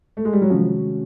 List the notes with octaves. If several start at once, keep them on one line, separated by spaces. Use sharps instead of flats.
A3
G#3
G3
F#3
C3 D#3 F3 G#3 C#4 F#4